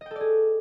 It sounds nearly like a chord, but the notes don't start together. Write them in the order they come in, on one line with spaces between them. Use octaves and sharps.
D#5 G5 A4 D5 G#4